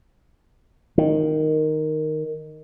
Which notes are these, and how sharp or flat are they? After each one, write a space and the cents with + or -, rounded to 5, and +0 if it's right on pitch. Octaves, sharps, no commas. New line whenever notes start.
D#3 -5